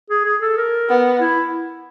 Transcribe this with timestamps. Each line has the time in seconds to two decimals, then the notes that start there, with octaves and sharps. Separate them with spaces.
0.10 G#4
0.25 G#4
0.41 A4
0.57 A#4
0.89 B3
1.20 E4